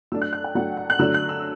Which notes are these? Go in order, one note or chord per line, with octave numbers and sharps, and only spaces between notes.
F#3 A3 D4 E6
F#6
F#6
G5
F#3 A3 D4 F#5
F#5
F#6
D3 F#3 A3 D4 E6
F#6
E6